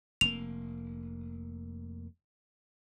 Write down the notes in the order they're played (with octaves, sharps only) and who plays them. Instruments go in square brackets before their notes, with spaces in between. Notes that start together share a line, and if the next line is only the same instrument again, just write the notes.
[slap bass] F1 A#3 [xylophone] F7